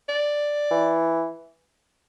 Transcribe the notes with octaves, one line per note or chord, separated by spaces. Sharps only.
D5
E3